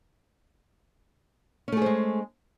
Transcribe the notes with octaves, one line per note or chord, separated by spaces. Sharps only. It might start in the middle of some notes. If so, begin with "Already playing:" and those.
G#3 A3 C#4 G#4 C5